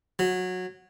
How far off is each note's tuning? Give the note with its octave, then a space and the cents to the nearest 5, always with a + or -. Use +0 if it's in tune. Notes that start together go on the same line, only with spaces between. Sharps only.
F#3 -15